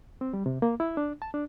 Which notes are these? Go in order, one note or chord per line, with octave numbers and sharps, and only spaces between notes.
C4
G3
C3
A#3
E4
D4
A5
D4